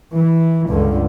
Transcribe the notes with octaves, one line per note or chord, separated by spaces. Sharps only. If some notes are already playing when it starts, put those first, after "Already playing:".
E3
C#2 G2 D3